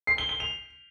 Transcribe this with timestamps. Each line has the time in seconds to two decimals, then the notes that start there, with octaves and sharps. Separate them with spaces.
0.07 C7
0.18 G7
0.29 G7
0.40 F7